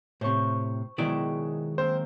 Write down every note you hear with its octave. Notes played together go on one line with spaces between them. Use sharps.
A2 C3 C5 C#6
B2 D#3 F#3 G#3 E4 D5
A#3 C4 C5